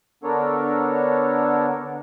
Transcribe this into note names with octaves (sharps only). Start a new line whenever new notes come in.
D3 B3 D4 A4 A#4 C#5